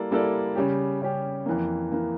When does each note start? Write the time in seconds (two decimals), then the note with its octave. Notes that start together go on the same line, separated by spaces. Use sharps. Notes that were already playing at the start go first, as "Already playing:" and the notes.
Already playing: G3 A#3 E4 A4 D5
0.11 G3 A#3 E4 A4 D5
0.55 C#3 G3 C#4 G4
1.01 C#3 G3 C#4 G4
1.46 F2 E3 A#3
1.92 E3 A#3